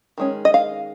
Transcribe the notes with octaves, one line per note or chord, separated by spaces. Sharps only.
D#3 G#3 C#4
D#5
F5